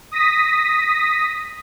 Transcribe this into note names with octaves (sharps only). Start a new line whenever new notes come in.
D#6 A#6 B6